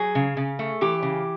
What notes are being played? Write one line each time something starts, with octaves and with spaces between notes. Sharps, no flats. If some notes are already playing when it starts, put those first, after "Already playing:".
Already playing: F#3 G#4
C#3
C#3
A3
E3 G4
C#3